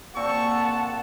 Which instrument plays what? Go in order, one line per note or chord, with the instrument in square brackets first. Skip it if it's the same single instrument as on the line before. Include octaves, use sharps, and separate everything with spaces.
[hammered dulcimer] A#2 C4 [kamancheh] F#5 A5 [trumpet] C#6